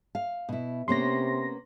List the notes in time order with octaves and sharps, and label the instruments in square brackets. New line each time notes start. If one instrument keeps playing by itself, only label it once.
[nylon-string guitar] F5
B2 E4
[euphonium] C3 [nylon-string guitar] A#3 B3 C#4 [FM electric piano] C6 A#6